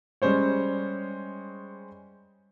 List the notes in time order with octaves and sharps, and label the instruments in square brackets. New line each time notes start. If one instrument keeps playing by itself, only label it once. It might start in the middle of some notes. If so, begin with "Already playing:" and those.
[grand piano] G3 G#3 C#4 C5 C#5